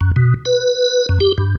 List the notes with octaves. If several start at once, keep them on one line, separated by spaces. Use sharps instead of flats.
F#2
B2
B4
F#2
G4
G2